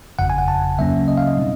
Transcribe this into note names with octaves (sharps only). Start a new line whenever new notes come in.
G1 F2 C#3 F#5
G#5
F#5
A5
D2 C#3 F#3 A#3 C#4 E5
D#5
F5
D#5
B2 G3 C4 D#4